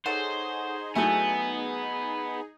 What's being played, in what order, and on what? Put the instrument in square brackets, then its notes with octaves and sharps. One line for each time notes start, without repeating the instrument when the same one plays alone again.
[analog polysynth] D#4 G#4 [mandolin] A4 C#5 F#5 [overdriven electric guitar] C5
[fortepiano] F#3 A3 E4 [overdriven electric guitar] B3 [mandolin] G#5 G6